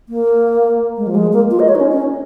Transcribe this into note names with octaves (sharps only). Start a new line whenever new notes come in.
A#3
G#3
F3
G#3
A#3
F4
D#5
C#5
D#4
C#4
C#4